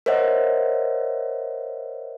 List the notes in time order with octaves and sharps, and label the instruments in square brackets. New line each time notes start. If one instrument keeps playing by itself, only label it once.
[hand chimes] A#4 C5 C#5 D#5 E5 F#5